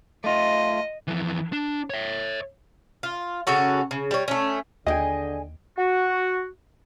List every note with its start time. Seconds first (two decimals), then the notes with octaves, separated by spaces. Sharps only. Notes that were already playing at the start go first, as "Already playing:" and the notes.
0.24 A3 F4 D#5
1.08 F2 E3
1.53 D4
1.90 C#5 E5
3.03 F4
3.47 C#3 C#4 F#4 A4
3.91 C#3
4.11 G3 C#5
4.28 A3 C#4
4.87 D#2 D3 G#4 D#5 G5 G#5
5.77 F#4